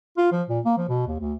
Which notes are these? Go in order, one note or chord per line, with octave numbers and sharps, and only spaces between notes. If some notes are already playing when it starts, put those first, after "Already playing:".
F4
F3
A#2
A#3
F3
B2
D#2
D2